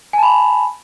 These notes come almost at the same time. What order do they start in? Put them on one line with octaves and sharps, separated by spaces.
G#5 A5 B5